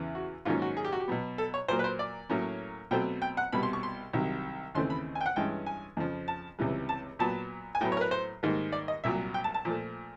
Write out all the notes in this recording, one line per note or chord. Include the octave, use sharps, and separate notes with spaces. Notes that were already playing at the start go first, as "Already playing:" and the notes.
Already playing: E2 C#3 E3
F#4
G#2 D#3 F#3 A#3 C#4 F4
F#4
G#4
G4
F#4
G4
B2 F#3 B3
A4
C#5
A#2 F#3 A#3 C5
B4
C5
D5
A2 F#3 A#3 C#4
B2 F#3 A3 C4 G5
G5
F#5
C2 B2 G3 B3 B5
C6
C#6
C6
C2 C3 D#3 F#3
D#2 C#3 E3 A3 C4 C6
B5
G#5
G5
F#5
G2 E3 G#3 C#4 G5
G#5
F2 C#3 F3
A5
C#2 C3 E3 G3
A5
A#2 F#3 B3 A5
G#5
A2 F#3 B3 G5
C#5
A#4
B4
C5
G#2 D#3 G3 A#3
D5
D#5
C2 A#2 F#3 E5
G5
A5
A5
A#2 F3 A3